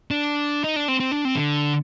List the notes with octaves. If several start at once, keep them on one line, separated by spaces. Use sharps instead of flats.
D4
D#4
D4
C4
C4
D4
C4
D3